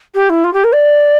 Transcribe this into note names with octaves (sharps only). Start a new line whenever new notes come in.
G4
E4
F4
G4
A#4
D5